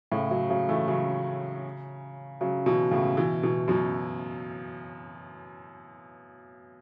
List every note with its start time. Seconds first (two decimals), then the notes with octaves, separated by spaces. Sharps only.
0.12 A2 C#3
0.31 C#3 F#3
0.50 C#3 F#3
0.69 E3 A3
0.88 C#3 F#3
2.41 C#3 F#3
2.66 B2 E3
2.91 A2 C#3
3.17 B2 E3
3.43 B2 E3
3.68 F#2 B2